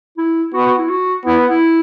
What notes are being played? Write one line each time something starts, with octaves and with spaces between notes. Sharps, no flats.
E4
B3 F#4
F#4
E4
F#4
B3 E4
E4